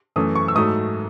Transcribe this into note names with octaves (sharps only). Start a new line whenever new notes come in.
F#2 E3 A3 D#6
C#6
E6
G#2 F#3 A3 D#6